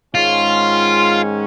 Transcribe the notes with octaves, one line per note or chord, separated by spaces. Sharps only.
G#2 D#3 G#3 C#4 F4